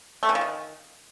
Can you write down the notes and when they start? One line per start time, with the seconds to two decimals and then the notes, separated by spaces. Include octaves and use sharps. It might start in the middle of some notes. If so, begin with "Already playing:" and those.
0.23 A3
0.29 E3
0.35 F3
0.41 D#3